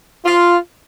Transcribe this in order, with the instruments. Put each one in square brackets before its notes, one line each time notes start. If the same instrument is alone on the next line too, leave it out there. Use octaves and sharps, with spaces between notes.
[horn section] F4